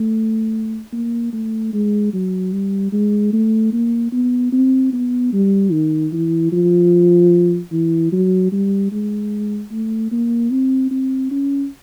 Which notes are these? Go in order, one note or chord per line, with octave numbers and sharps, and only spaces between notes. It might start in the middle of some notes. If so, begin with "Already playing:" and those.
Already playing: A3
A#3
A3
G#3
F#3
G3
G#3
A3
A#3
B3
C4
B3
G3
D#3
E3
F3
E3
F#3
G3
G#3
A3
A#3
C4
C4
C#4